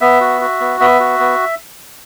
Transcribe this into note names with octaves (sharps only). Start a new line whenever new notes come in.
B3 E5
F#4
F#4
B3
B3 E5
F#4
B3